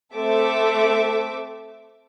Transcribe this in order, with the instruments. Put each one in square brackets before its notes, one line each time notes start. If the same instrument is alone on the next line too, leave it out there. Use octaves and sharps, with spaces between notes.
[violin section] A3 C4 A4 E5 D6